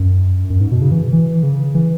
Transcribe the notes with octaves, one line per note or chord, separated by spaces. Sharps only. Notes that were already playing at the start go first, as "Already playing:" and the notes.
Already playing: F#2
F#2
G#2
B2
C#3
E3
E3
C#3
E3